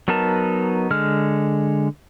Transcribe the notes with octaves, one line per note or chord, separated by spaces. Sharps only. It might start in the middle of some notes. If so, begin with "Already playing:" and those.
F#3 B3 D#4 A#4 A5
D3 G#3 F6